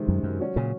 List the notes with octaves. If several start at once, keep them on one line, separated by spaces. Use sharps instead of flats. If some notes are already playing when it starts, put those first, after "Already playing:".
Already playing: C3 D#3 G#3 C4
F#2
F#2
F#3 C#4 F#4
A#2 C#3